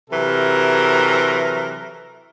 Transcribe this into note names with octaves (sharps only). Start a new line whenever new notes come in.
C3 E3 F#3 A4 A#4